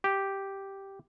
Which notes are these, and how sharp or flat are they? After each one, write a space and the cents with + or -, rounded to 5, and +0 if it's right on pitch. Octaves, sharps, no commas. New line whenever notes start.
G4 -5